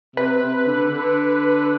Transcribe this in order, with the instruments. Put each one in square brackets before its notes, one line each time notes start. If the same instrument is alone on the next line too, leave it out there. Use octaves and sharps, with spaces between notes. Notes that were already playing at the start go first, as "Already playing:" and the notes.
[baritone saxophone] C3 [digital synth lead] B4
[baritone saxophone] C3
D3
D3